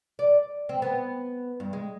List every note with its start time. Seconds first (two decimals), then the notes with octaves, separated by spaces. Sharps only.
0.19 D5
0.69 C4
0.82 B3
1.60 G2
1.73 G#3